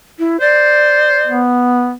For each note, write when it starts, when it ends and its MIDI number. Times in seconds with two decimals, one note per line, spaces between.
0.19 0.40 64
0.40 1.47 72
0.40 1.35 74
1.28 1.94 59